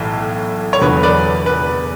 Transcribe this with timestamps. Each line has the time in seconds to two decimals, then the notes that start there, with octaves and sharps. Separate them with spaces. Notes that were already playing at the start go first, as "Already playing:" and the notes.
Already playing: B1 A2 E3
0.73 C#5
0.81 E2 D3 F#3 B4
1.03 B4 D5
1.46 B4